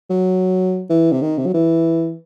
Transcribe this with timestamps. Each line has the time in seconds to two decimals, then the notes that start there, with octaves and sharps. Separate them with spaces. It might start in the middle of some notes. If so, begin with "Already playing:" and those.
0.10 F#3
0.90 E3
1.12 C3
1.22 D#3
1.38 C3
1.46 F#3
1.54 E3